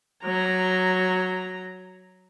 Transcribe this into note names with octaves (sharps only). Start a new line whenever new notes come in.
F#3 A#5